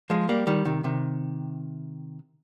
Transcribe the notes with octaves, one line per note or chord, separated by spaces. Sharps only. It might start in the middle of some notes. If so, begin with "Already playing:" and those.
F3 G#3
G3 A#3
D#3 G3
C3 D#3
C3 D#3